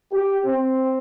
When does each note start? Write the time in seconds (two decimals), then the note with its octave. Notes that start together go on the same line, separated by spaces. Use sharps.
0.11 G4
0.44 C4